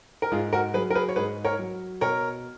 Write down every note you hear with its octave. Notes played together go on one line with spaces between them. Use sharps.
A#4
G#2 F4 G#4
F#4 A#4
F#3 G#4 B4
A#4
G#4 B4
C#5
G#2 G#4 B4
A#4 C#5
F#3
B2 A#4 C#5